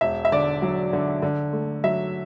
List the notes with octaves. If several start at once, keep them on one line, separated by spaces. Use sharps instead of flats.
E1 E5
E5
D3 D5
F#3
D3
D3
A3
F#3 E5